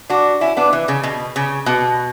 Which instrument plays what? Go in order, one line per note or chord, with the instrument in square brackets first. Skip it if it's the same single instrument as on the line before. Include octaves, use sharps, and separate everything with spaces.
[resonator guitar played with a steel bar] D4 F#4
C#4 E4
B3 D4
E3
C#3
B2
C#3
B2